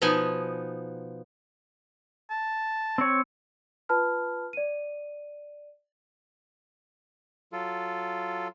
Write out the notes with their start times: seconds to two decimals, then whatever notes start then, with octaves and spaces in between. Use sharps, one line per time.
0.02 B2 F3 B3 D#4 G#5
2.30 A5
2.98 C4 C#5
3.89 F4 B4 A5 B5 F6
4.53 D5 D#7
7.52 F#3 F4 A4